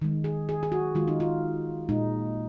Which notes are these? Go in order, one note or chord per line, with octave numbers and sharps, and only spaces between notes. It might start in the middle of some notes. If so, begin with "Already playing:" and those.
D#3 G#3
G#4
G#4
G#4
F#4
D#3 G#3 F4
D#4
F4
A#2 G#3 D#4